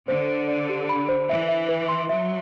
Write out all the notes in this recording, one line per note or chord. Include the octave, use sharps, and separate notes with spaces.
D3 C5
C5
D5
G4
B5
C5
E3 E5
E5
B4
C6
F#3 E5